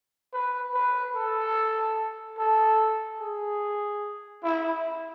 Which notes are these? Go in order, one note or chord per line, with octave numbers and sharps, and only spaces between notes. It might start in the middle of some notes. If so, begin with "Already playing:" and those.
B4
B4
A4
A4
G#4
E4